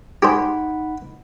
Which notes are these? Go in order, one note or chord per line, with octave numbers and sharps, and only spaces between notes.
D#4 G4 G#4 C5 F#5 B5